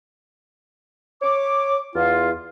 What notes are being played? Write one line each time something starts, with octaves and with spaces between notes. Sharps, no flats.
C#5 D6
E2 F4